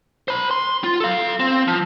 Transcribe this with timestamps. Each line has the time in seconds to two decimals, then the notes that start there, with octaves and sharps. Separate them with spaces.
0.28 C5 B5
0.51 C6
0.84 F4
1.00 A4 F5
1.40 C4
1.68 F3